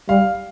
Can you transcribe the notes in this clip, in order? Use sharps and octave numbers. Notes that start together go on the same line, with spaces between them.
G3 F5